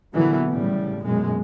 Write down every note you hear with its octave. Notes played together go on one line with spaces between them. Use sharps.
A#2 D3 E3 F#3 B3
A2 C#3 G3
A#1 F#2 B2 G#3